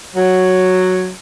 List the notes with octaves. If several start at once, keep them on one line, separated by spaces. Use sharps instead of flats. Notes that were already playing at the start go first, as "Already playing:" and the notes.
F#3